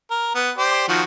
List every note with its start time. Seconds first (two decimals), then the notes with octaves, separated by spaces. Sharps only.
0.11 A#4
0.35 B3
0.58 G4 C5 D5
0.88 D#3 F3 F#4